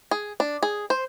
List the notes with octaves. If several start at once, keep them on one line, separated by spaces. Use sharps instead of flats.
G#4
D4
G#4
C5